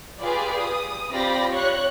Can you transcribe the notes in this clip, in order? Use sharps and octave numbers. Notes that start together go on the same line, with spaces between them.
F4 G4 G#4 B4 D5
D#6
C4 F4 G4 D5 B5 A#6
C#5 C#6 F#6